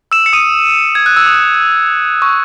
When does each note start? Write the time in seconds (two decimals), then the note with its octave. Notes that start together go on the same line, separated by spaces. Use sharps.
0.12 E6 E7
0.26 C#7
0.33 D#6 D#7
0.95 G#6
1.06 F#6
1.17 E6
1.27 D#6
2.22 C#6